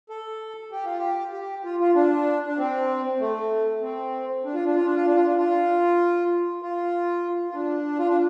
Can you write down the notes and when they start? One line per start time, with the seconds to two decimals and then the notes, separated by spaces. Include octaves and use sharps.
0.10 A4
0.72 G4
0.85 F4
0.98 G4
1.33 G4
1.65 F4
1.80 F4
1.95 D4
2.47 D4
2.58 C4
3.20 A3
3.82 C4
4.45 D4
4.54 F4
4.65 D4
4.75 F4
4.85 D4
4.96 F4
5.06 D4
5.16 F4
5.26 D4
5.37 F4
6.62 F4
7.50 F4
7.54 D4
7.98 F4
8.08 D4